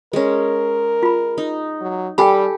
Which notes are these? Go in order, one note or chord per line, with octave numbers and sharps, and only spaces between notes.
G#3 C#4 A#4
F4 B5
D#4
F#3
G3 G4 A4 G5 G#5 B5